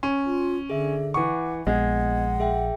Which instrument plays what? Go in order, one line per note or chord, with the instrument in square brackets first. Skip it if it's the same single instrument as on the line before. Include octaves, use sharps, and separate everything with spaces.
[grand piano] C#4
[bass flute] F4
[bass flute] D3 [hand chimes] G#4 E5
[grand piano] E3 C#6 [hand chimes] F#5 D6
[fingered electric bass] A#1 [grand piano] G#3 [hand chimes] B3 D#5 G#6 [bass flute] F#5
[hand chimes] G#4 E5 G5